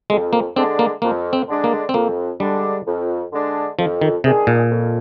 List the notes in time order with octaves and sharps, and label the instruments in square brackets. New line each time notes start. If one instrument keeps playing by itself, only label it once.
[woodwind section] F2 [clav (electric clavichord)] G#3
[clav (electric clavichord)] A#3
[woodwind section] D3 G#3 D4 [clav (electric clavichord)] C4
[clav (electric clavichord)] A#3
[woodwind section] F2 [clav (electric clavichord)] A#3
[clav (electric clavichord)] C4
[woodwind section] D3 G#3 D4
[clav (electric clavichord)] A#3
C4
[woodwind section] F2 [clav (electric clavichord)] A#3
[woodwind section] D3 G#3 D4 [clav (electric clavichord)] G3
[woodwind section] F2
D3 G#3 D4
[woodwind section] F2 [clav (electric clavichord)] F3
[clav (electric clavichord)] D#3
[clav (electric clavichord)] C3 [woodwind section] D#3 G#3 D4 G#4
[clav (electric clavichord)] A#2
[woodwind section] F2